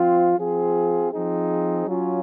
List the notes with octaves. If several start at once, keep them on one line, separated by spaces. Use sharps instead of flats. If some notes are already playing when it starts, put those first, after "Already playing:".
Already playing: F3 C4 F4
F3 C4 F4 G#4
F3 C4 D#4 G#4
F#3 C#4 F4